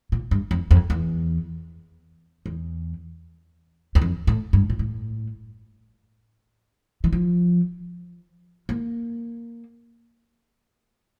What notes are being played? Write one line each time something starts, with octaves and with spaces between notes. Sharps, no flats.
A#2
G2
F2
F2
E2
E2
E2
F2
A2
G2
A#2
A2
E3
F3
A#3